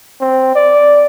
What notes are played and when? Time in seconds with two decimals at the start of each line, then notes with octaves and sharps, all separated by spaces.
0.21 C4
0.55 D5